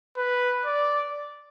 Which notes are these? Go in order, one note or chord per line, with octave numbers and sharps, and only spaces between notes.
B4
D5